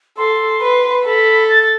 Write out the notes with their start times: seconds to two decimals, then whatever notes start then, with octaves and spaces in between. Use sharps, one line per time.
0.17 A4 C6
0.61 B4
1.05 A4 B5
1.49 A6
1.63 A6